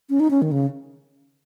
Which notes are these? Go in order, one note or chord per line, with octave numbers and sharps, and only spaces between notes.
C#4
D#4
C#4
D#3
C#3